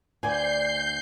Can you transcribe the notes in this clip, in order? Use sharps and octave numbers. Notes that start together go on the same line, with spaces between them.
D2 B4 C5 D5 G#5 G6 C7